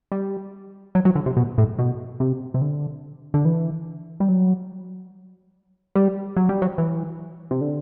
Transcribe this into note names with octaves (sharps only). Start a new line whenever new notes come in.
G3
F#3
F#3
D3
C3
B2
A2
B2
C3
C3
D3
D3
E3
G3
F#3
G3
F#3
G3
F#3
E3
C3
D3